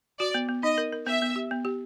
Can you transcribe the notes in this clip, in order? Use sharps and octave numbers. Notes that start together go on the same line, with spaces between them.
F#4 D5
B3
B3
D#4 D#5
A#4
A#4
B3 E5
B3
G4
B3
G4